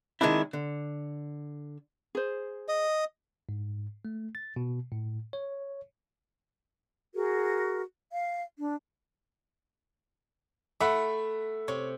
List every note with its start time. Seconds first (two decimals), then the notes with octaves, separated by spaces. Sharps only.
0.21 D#3 G#3 C4 D4 E4
0.53 D3
2.15 G#4 C5
2.68 D#5
3.49 G#2
4.05 A3
4.35 A6
4.56 B2
4.92 A2
5.33 C#5
7.15 F#4 G#4 A#4
8.11 F5
8.57 D4
10.80 A3 E5 F#5 B5
11.68 C3 C#5